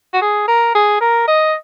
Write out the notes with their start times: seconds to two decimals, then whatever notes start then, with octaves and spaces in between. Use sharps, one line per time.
0.13 F#4
0.22 G#4
0.48 A#4
0.75 G#4
1.01 A#4
1.27 D#5